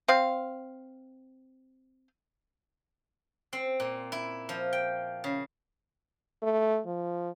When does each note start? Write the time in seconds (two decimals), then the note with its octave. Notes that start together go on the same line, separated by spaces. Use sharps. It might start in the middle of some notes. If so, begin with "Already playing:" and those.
0.08 C4 F5
3.53 C4
3.80 A#2
4.12 E4
4.49 F3
4.73 G5
5.24 C#3
6.43 A3
6.86 F3